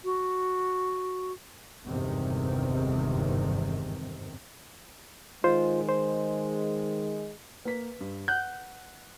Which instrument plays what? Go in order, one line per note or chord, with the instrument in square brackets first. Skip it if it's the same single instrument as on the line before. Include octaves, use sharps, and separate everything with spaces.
[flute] F#4
[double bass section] G1 E2 G#2 C3 D#3 C4
[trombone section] D#3 G#3 [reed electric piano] F4 C5
[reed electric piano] C5
[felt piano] A#3 B6 [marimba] B4
[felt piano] G2
[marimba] F#5 [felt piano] F#6 [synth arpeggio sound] G6